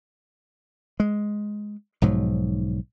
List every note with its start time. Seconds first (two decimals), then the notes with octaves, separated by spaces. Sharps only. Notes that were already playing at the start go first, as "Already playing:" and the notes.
1.00 G#3
2.02 B1 G#2 F3 F#3